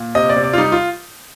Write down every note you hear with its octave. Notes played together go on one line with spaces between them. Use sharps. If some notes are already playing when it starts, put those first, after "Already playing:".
Already playing: A#2
C3 D#5
D5
C3
D5
F4
G3 D#4
F4